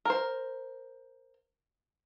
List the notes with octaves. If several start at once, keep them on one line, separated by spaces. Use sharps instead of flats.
A#4 C5